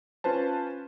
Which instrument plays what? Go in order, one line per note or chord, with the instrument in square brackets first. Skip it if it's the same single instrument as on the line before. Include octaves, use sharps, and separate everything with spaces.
[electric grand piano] C#4 F4 B4 C5 A5